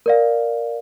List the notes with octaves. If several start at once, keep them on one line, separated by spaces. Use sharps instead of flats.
A#4 D5 F5